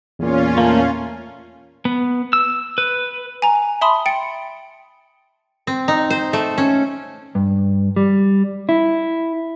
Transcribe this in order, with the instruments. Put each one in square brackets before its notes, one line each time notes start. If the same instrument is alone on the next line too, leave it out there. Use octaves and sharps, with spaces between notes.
[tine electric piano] E2 A#2 [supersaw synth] C#4 F4
[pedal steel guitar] A3 A#3
B3
E6
B4
[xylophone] G#5 A#5
E5 A5 B5 C6 D#6
G5 A6 C#7
[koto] C4
D#4
C5
A3
C#4
[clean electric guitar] G2
G3
E4